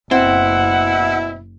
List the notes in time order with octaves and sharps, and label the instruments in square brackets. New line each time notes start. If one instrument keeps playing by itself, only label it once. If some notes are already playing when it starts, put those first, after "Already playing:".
[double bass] F#1 [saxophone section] B2 E4 [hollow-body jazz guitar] C4 [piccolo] F#5